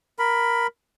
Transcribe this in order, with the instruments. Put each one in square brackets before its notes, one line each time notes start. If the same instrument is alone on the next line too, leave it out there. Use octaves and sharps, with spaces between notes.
[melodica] A#4 B5